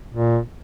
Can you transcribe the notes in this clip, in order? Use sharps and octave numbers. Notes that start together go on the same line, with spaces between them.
A#2